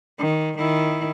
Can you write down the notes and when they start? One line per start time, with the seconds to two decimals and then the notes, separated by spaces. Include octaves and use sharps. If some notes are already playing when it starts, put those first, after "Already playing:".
0.19 D#3
0.58 D#3 E4